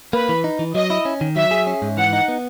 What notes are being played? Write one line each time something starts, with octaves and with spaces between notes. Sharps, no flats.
A#3 B4
E3
D#4
E3
F#3 D#5
E4
C#4
D#3
F#3 E5
G#4
C#4
G#2
E3 F#5
D#4
B3